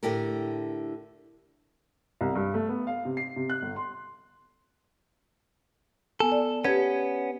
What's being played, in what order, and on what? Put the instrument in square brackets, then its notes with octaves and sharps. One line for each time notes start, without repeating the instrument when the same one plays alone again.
[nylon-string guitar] A2 D3 E4 G4 A4 A#4
[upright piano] C2
G2
A3
B3
F5
C3
C7
C3
F#6
G1
C6
[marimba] B3 G#5 [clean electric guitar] A4
[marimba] D5
[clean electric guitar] B3 C#4 [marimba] G4 B4 G#6